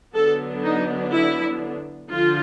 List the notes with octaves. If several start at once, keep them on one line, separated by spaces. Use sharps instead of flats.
D3 F#3 B3 D4 A4
D#4
E4
D3 F3 F4